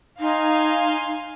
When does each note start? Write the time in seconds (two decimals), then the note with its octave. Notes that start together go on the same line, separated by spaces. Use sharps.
0.20 D#4 F5 G#5 C6